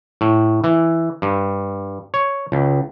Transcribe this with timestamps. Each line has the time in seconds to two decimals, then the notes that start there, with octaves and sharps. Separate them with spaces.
0.21 A2
0.64 E3
1.22 G2
2.14 C#5
2.52 C#2